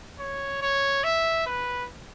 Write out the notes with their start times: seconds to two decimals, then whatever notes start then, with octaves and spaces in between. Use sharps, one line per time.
0.19 C#5
0.62 C#5
1.04 E5
1.46 B4